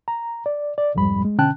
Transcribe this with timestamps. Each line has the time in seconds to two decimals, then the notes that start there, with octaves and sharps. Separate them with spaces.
0.08 A#5
0.46 D5
0.78 D5
0.95 C2 F2 G#2 G3 B5
1.25 G#3
1.38 B2 D3 C#4 G5 A5 F#6